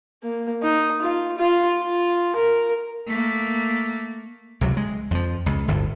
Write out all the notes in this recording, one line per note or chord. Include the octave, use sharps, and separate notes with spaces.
A#3
D#4
F4
F4
F4
A#4
A3 A#3
C#2 C3 F#3
G#3
F2 F3
C#2
G1 D2 A2